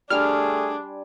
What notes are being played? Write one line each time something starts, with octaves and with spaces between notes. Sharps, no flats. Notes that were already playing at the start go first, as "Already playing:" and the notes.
G3 A3 D4 G#4 G#5 C6 F6